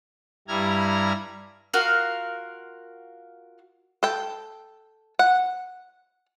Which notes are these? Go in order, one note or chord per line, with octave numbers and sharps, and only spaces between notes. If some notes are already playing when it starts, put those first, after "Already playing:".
G2 G3 E4 A#5 F6 G#6
F4 F#4 A#4 F5
A4 G5
F#5